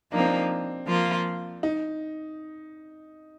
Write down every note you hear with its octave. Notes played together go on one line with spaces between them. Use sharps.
F3 A#3 D4 D#4
C4
D4
F3 A#3 F4
D#4